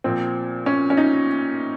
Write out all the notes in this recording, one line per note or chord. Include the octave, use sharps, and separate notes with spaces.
A#2 F3 C4
C#4
C#4
D#4